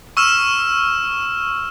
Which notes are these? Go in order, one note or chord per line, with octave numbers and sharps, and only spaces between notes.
C#6 E6 F6 E7